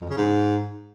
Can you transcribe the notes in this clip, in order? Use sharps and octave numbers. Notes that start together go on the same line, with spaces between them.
F2
C#3
G#2